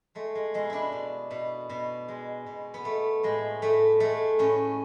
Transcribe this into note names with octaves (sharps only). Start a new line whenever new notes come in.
G#3 A3
G#3
B2 G#3
D4 E4
B2
B2
B2
G#3
B2
B3
B2 A3
A2 G#3
A2 A3
G#3 A3
A2 C#4